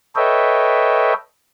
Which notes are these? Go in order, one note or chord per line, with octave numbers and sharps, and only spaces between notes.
A4 B4 C#5 D#5 E5 G5